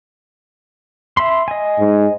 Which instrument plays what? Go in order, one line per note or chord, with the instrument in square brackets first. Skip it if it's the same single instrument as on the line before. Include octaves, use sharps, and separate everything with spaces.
[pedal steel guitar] E5 B5 C6
D#5 G#5
[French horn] G#2